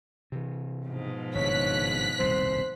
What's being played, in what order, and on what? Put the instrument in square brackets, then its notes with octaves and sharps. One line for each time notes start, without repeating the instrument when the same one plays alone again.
[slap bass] C3 E3
[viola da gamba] G#2 B2 F3
[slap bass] G#1 G2 C#3 [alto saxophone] C#5 [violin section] F#6 B6
[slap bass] D#1 C2 F2 [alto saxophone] C5